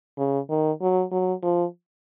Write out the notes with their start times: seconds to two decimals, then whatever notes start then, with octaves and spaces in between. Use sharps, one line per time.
0.18 C#3
0.50 D#3
0.82 F#3
1.12 F#3
1.43 F3